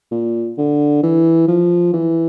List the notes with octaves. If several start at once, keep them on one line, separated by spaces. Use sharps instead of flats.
A#2
D3
E3
F3
E3